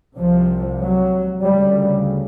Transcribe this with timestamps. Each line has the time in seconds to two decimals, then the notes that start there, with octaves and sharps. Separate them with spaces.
0.17 C2 C3 F3
0.81 F#3
1.43 D2 C#3 G3